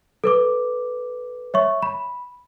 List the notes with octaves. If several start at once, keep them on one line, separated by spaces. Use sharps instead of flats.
A4 B4 D6
C#5 E5 C#6
B5